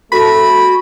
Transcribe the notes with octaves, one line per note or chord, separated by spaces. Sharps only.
A3 C4 F#4 A4 B5